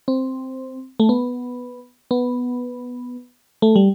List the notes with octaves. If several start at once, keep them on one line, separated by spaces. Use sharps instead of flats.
C4
A3
B3
B3
A3
G3